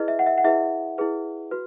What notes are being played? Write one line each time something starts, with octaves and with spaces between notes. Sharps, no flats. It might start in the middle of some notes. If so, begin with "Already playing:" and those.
Already playing: E4 G#4 B4 D#5
E5
F#5
E5
F#5
E4 G#4 B4 E5
E4 G#4 B4
F#4 B4